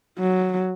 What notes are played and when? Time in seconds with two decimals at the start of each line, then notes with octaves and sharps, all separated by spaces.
0.19 F#3